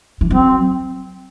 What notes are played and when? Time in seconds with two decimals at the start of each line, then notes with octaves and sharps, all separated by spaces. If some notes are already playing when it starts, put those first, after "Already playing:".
0.21 E3
0.30 F#3 C4